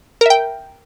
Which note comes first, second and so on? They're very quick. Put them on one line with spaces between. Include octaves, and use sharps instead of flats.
A#4 E5 G5